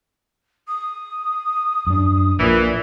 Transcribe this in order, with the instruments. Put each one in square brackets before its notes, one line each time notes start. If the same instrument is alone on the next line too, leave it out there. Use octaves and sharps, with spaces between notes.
[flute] D#6
[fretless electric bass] F#2 D4
[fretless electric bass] A#1 [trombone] A#2 [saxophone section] E3 [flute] D5